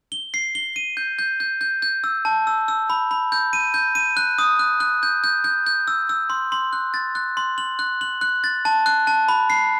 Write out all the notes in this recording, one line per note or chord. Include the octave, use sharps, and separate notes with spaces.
G7
C7
G7
D#7
G6
G6
G6
G6
G6
E6
A5
E6
E6
B5
B5
G6
D#7
G6
D#7
F#6
D#6
F#6
F#6
G6
G6
G6
G6
E6
E6
C6
C6
F#6
A6
F#6
C6
F#7
F#6
F#7
F#6
A6
A5
F#6
A5
B5
C7